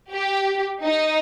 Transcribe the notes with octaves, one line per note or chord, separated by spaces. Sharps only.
G4
D#4